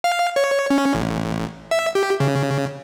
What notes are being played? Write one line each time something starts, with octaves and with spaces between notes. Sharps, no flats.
F5
C#5
C#4
A1
E5
G4
C#3